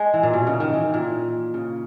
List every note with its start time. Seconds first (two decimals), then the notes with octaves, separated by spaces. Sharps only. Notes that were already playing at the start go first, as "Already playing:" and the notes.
Already playing: G#3
0.14 E3
0.23 A#2
0.33 B2
0.47 C#3
0.60 D#3
0.73 E3
0.94 A#2
1.54 C#3